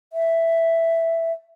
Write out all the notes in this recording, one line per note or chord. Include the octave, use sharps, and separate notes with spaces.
E5